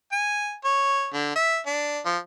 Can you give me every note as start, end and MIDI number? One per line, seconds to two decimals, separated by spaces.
0.12 0.54 80
0.65 1.09 73
1.14 1.33 50
1.36 1.58 76
1.66 2.00 62
2.06 2.18 53